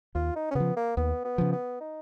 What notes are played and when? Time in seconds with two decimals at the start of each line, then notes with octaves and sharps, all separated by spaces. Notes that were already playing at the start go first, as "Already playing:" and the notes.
0.15 D#2 F4
0.35 D#4
0.51 C#4
0.55 C#3 B3
0.60 F3
0.76 A#3
0.96 D#2 B3
1.24 B3
1.38 C#3 F3
1.52 B3
1.80 D#4